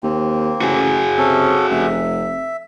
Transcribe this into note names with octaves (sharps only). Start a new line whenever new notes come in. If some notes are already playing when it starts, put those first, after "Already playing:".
D#2 A#3 C4
A1 F#4 G#4
C3 C#4 A4
F1 E5